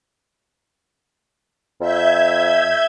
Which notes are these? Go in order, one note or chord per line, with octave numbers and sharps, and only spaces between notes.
F2 E5 G6 G#6